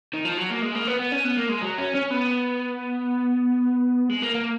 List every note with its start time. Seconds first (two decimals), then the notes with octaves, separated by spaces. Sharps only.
0.13 D#3
0.25 F3
0.38 F#3
0.51 A#3
0.62 G#3
0.75 A#3
0.87 B3
0.99 B3
1.12 C#4
1.24 B3
1.37 A#3
1.49 G#3
1.62 F#3
1.78 C#4
1.95 C#4
2.11 B3
4.10 G#3
4.22 A#3
4.35 A#3